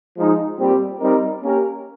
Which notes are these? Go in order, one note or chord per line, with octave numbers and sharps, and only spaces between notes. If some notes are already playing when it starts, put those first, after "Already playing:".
F3 G#3 D#4
A#2 G3 C4 G4
G3 C4 D#4 A#4
A#3 C#4 G4 A#4